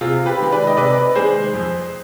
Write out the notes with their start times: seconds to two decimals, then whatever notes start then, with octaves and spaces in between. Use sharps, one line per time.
0.01 C3 F4 G#4
0.26 G4 B4
0.39 D#3 G#3
0.52 B4 D5
0.67 D#5
0.77 C3 B4 D5
1.15 D#3 G#3 G#4 C5
1.53 F2